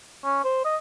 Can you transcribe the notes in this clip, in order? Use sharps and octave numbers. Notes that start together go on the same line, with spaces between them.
C#4
C5
D#5